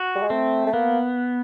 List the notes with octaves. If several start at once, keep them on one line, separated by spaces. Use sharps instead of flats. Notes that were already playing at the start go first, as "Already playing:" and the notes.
Already playing: F#4
G3
G#3
A3 C4
A3
A#3 B3